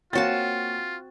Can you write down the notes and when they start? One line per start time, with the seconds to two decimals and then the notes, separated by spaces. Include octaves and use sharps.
0.13 A#3 C4 F4 F#4 C#5 A5 A6